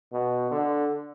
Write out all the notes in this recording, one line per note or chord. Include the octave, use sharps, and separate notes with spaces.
B2
D3